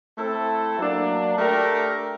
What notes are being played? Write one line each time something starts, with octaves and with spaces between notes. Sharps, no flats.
A3 C4 E4 A4
F#3 A#3 D4
A3 D4 G4 A#4